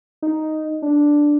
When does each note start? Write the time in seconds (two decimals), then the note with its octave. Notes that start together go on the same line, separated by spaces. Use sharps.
0.22 D#4
0.82 D4